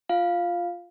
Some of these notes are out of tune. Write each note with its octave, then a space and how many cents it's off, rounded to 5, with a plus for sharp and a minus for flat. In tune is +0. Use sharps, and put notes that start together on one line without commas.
F4 +0 F5 +0